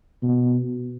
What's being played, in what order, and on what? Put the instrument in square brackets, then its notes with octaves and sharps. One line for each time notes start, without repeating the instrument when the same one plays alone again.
[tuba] B2